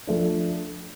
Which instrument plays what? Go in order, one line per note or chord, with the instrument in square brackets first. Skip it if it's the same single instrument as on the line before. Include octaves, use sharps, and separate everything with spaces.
[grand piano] F3 A3 D4